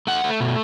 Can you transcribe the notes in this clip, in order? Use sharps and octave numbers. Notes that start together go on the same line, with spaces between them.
A3 F#5
A3
B2